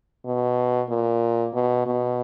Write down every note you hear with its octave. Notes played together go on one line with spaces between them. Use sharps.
B2
A#2
B2
B2